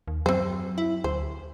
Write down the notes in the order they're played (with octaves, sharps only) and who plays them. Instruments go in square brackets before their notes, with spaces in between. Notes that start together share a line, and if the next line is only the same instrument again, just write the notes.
[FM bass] D#2
[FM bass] F#2 [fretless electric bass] F#3 [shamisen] C4 C5
[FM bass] E4
[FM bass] D2 [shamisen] C5